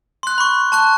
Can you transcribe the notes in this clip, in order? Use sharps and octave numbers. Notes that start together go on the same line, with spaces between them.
C6 F#6
B5 C#6
A5 C#6 F#6